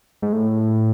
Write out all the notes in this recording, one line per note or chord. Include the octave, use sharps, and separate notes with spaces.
G#2
A2